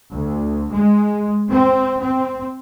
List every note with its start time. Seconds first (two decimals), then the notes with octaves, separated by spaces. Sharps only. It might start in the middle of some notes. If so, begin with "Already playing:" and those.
0.13 D2
0.73 G#3
1.51 C4
2.00 C4